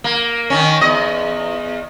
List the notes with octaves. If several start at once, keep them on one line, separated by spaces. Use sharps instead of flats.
A#3
D#3 C#4
E2 D#5